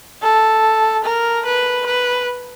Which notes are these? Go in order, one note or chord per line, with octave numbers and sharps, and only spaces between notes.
A4
A#4
B4
B4